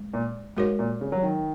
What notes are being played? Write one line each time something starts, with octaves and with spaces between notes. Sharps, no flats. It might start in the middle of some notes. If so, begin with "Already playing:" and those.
Already playing: G#3
A#2
G#2 G#3 F#4 A#4 C#5
A#2
C#3
F#3
D#3